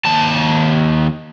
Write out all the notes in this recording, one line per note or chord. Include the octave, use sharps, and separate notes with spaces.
D#2 A5